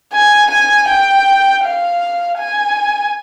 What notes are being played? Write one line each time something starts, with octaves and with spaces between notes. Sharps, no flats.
G#5
G#5
G5
F5
G#5